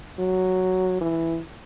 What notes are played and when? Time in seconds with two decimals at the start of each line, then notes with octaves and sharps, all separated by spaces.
0.19 F#3
1.01 E3